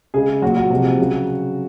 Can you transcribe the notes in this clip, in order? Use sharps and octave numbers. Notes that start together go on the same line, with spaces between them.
C#3 G#3 G#4
A#2 F#3 F#4
F#4
C3 F3 G#3
C#3 F#3